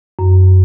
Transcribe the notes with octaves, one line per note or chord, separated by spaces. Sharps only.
F#2